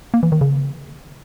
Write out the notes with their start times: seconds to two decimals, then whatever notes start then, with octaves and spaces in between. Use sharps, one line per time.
0.14 A#3
0.23 E3
0.32 D#3
0.41 C#3